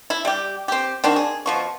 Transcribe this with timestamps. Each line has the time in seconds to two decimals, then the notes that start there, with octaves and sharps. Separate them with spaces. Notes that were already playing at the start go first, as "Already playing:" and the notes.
0.10 E4
0.25 G3 G4
0.68 C4 G4
1.04 D#3 C4 D4 F#4
1.16 G#4
1.46 B2 F3 C#6